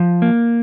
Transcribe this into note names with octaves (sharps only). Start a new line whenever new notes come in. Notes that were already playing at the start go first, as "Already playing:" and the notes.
Already playing: F3
A#3